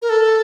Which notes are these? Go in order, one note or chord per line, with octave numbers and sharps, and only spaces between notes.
A#4
A4